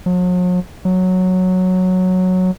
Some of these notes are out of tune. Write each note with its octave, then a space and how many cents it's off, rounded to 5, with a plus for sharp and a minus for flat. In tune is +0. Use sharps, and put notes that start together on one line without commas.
F#3 -45
F#3 -5